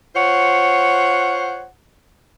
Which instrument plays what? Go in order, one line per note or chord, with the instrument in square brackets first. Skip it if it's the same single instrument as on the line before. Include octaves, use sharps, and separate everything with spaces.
[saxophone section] F4 C5 C#5 F#5